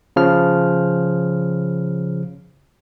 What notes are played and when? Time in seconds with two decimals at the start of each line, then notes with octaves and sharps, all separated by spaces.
0.16 C#3 F3 F6